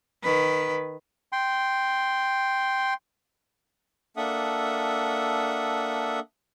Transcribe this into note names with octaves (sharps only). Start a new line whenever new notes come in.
D#3 B4
G5 C6
A#3 D4 A4 E5 F#5 D#6